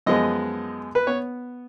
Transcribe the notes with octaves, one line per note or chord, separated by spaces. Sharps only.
F#2 F3 G#3 B3 D#5
B4
B3 C#5